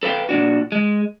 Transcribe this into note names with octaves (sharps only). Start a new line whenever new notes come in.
A4 B4 F5 G5
A#2 D#3 D4 F#4
G#3